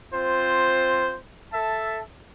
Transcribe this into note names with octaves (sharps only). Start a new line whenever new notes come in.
C4 F4 C5
A4 E5 A5